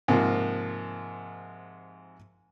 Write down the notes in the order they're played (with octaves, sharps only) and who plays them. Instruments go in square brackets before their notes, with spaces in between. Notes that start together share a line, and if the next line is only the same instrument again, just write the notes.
[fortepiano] G#2 C3 F3 A#3